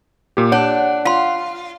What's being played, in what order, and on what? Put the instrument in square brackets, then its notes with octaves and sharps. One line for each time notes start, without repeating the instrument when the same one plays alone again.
[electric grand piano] A#2 G4
[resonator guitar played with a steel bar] D4 [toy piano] C#5 [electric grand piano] F#5
[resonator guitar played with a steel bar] F4 [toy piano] F5 C6